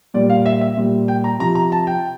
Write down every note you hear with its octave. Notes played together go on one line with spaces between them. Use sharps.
A#2 G3 D5
F5
E5
E5
A#2 G3
G5
A#5
C3 F3 A#5
A#5
A5
G5